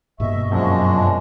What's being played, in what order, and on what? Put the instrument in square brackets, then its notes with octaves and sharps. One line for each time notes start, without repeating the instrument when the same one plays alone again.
[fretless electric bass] G2 B2 A#3 [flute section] D#5 C#6 [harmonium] E5
[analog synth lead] F#2 [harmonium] F3 G#3 D4